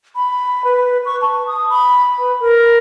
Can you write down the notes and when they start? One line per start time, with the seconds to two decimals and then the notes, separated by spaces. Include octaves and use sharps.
0.15 B5
0.64 B4
1.05 C#6
1.22 A5
1.47 D#6
1.70 B5
2.19 B4
2.40 A#4